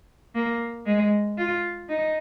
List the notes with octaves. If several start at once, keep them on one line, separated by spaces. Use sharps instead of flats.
A#3
G#3
F4
D#4